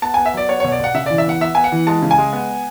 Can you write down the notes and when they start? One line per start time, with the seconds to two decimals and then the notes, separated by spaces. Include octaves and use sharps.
0.02 B3 A5
0.14 B3 G#5
0.26 E5
0.34 F#3 D5
0.49 B3 C#5
0.60 B2 C#5
0.72 D5
0.80 B2 F#5
0.94 C#3 E5
1.06 E3 D5
1.18 E5
1.26 B3 F#5
1.41 B3 E5
1.55 B3 G#5
1.64 F#5
1.72 E3
1.87 G#3 A5
2.02 C#3
2.11 G#5
2.18 G#3
2.33 B3